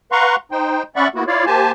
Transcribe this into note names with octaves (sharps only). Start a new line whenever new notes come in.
B4 F5 F#5 A#5 C6 C#6
D#4 C5 G5
C#4 D5 E5 F#5 B5 C#6
A#3 B3 E4 F#4
E4 F4 C#5 D5 F5
A#3 G4 C5 G#5 A5